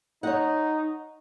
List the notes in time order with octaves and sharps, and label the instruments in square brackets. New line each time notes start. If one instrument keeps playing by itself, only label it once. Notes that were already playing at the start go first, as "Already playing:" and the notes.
[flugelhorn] D#4 [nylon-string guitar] C#5 F#5